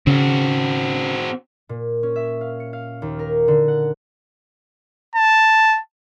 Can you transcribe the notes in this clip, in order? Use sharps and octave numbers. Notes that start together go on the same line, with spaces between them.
C#3 C4 F#4
A#2
C#4
E5
F5
C#7
F5
D#2
A#4
D3
F#5
A5